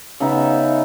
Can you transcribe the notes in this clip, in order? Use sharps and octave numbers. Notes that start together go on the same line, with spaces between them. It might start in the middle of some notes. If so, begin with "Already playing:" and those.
C#3 B3 D#4 E5